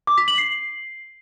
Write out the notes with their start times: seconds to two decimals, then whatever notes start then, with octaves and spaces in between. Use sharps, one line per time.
0.07 D6
0.18 B6
0.28 F#7
0.38 C7